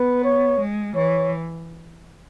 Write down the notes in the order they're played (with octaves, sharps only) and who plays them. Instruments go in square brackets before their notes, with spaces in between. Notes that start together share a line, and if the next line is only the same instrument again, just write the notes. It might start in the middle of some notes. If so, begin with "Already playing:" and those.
Already playing: [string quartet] B3 [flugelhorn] B4
[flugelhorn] C#5
[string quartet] G#3
[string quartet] E3 [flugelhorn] C#5